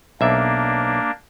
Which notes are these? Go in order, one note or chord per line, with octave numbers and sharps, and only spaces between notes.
B1 A#3 D4 E5